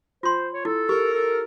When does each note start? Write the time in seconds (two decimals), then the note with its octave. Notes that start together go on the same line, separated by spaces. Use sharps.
0.23 F4 C5 C6
0.54 C#5
0.65 E4 A4
0.89 G4 A#4
1.14 A4